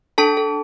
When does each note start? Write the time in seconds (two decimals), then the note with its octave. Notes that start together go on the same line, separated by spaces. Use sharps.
0.18 D4 A4 A5
0.37 A4